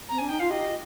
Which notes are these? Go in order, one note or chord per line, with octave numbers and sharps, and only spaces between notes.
C4 A#5
D4 G#5
D#4 G5
F4 F5
G4 D#5